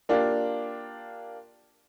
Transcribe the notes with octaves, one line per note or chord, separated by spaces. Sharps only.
A#3 D4 F4 G4